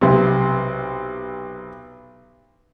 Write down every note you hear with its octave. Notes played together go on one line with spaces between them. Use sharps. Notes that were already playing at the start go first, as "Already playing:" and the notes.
B1 C3